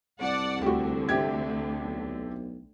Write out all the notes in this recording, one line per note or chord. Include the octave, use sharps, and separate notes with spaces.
C2 D5 F#5 A5
D2 D3 F#4 G4
C3 G4 G#6
B1